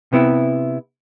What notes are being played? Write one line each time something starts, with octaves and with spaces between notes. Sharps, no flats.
C3 B3 E4